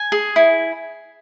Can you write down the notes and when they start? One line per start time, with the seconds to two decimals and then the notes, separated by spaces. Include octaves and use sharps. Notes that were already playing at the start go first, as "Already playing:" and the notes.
Already playing: G#5
0.12 G#4
0.36 E4